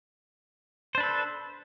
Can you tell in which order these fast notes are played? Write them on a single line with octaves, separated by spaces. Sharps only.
C5 D4 B4 A4